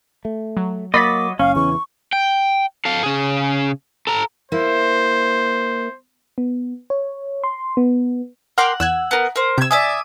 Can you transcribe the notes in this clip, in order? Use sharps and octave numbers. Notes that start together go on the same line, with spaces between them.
A3
F#3
F#3 A#3 D#5 B5 D6 A6 B6
F#1 C#4 F5
E2 C#3 E3 C#6
G5
A4 F5
C#3 G#4
A4 A#5
A#3 E4 C5
B3
C#5
C6
B3
A#4 F#5 G5 C6 D6 F6
E2 E6 F#6 G#6
B3 A#4
A#4 C5
C3 E6 G6 G#6
D5 E5 G#5 D#6